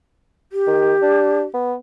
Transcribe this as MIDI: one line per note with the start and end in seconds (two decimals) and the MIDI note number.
0.52 1.42 67
0.67 0.94 51
1.02 1.43 62
1.54 1.75 59